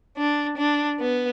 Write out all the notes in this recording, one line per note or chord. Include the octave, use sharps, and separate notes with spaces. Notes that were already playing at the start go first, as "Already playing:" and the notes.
D4
D4
B3